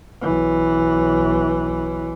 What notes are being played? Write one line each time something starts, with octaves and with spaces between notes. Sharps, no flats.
B1 E3